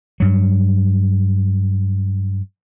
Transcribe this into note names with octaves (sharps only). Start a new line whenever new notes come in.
G2 F#3